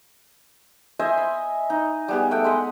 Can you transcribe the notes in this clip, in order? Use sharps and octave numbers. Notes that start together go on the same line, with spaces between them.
C5 D#5 E5 G#5
B5
D#4
G3 B3 G#4
A3 F#5 G5
G#3 D#5 B5